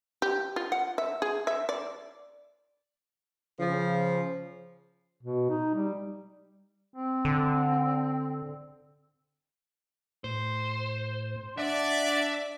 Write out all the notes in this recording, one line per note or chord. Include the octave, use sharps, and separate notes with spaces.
G4
F4
F#5
E5
G#4
E5
D5
C#3 F3
B2
D#4
G3
C4
D3
A2 C5
D4 D5 E5 F#5 A5